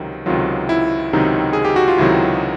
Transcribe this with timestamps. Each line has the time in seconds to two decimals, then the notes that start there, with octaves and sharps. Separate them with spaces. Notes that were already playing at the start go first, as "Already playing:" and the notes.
Already playing: C#2 C3 D#3 F#3
0.26 C#2 C3 D#3 F#3 F4
0.69 E4
1.13 C#2 C3 D#3 F#3 D#4
1.53 G#4
1.65 G4
1.76 F#4
1.88 F4
1.98 C#2 C3 D#3 F#3 E4